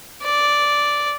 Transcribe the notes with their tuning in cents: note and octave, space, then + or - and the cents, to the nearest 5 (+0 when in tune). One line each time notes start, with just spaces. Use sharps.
D5 -5